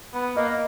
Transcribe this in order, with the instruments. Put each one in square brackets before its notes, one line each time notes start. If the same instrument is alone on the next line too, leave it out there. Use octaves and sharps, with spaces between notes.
[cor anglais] B3
[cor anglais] A#3 [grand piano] D#5